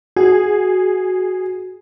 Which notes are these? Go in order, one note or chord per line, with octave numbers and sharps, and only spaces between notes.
F#4 G#4